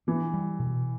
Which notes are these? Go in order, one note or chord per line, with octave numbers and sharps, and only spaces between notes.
E3 D4
G3
B2